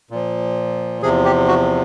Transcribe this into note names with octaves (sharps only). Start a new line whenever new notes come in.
A#2 F3
E2 C3 F3 G#4
G4
F#4